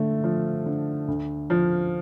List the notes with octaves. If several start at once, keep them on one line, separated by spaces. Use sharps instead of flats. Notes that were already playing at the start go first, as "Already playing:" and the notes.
Already playing: D3 A3
F3
D3
D2
F3